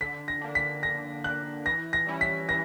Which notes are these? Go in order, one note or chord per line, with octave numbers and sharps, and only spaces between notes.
D3 B6
A#6
A#3 D4
B6
D3 A#6
A#3 D4 F#6
E3 A#6
A#6
G3 C#4 E4
B6
E3 A#6